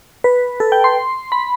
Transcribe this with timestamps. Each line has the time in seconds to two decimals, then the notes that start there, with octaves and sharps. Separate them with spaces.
0.24 B4
0.60 A4
0.72 G5
0.84 C6
1.32 B5